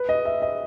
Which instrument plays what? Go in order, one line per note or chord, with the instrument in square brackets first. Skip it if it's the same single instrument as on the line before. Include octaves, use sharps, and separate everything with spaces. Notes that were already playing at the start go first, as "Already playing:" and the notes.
Already playing: [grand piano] B4
D#5
E5
D#5